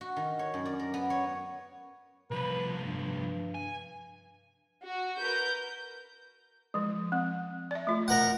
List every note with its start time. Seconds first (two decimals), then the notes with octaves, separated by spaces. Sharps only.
0.01 F#4
0.16 D#3
0.39 C#5
0.54 F#2
0.65 D5
0.79 A#4
0.94 B3
1.10 C#5
2.31 C2 F3 B4
2.77 G2
3.55 G#5
4.81 F#4
5.17 A#4 B4 G6
6.74 F3 G#3
7.12 C4
7.71 D5 E5
7.87 A3 F4
8.08 A#4 F#5